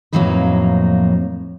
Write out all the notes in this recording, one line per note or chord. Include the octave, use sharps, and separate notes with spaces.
F2 A2 F#3 A#3 D#4 B4